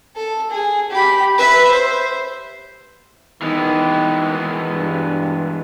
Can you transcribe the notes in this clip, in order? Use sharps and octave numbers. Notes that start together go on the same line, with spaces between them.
A4
G#4
G4 B5
B4 E5
C5
D#3 E3 G#3 B3
G2